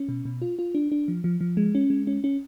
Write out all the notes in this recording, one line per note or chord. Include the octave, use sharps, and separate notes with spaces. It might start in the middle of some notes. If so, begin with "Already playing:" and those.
Already playing: C#4
B2
B2
F4
F4
D4
D4
F3
F3
F3
G#3
C#4
G#3
C#4
C#4